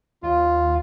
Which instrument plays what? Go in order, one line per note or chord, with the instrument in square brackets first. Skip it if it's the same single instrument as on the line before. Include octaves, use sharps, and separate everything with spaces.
[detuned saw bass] D#2 [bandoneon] F4